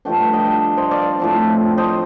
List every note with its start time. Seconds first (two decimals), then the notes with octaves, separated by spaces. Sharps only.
0.05 G2 F3 A3 D4 G5
0.33 D#5 G5
0.77 C5 D#5
0.91 D5 F5
1.20 A2 F3 C4
1.78 C5 D#5